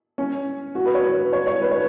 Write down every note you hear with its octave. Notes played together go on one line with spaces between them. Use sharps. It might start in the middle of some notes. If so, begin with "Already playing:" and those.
C#4
F#4
B4
C#5
B4
C#5
C#5
B4
C#5